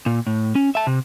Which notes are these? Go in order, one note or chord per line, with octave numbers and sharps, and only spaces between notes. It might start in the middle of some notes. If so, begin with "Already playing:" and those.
A#2
A2
C#4
E5 A5
C3